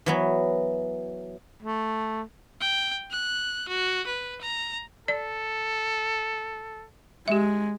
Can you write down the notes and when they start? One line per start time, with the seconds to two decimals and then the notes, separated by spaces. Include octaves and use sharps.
0.06 E3 F#3 B3
1.62 A3
2.61 G5
3.11 F#6
3.69 F#4
4.07 B4
4.41 A#5
5.08 A4 D5
7.28 G#3 G4 E5